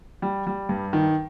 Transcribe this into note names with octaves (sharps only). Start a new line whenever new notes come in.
G3
G3
G2
D#3